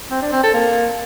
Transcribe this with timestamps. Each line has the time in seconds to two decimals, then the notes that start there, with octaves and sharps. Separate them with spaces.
0.11 C4
0.22 D4
0.32 C4
0.43 A4
0.54 A#3